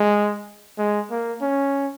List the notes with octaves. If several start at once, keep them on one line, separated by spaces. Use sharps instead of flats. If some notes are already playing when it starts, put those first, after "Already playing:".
Already playing: G#3
G#3
A#3
C#4